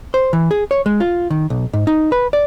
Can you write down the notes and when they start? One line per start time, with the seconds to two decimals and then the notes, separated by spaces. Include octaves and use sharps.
0.14 C5
0.33 E3
0.51 G#4
0.71 C#5
0.86 G#3
1.00 F4
1.30 D#3
1.50 B1
1.73 G#2
1.87 D#4
2.12 B4
2.33 D5